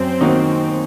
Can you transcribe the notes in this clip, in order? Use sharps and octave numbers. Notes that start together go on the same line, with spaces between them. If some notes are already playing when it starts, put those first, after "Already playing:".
Already playing: F#2 C4
D#3 A#3 D#4 F#4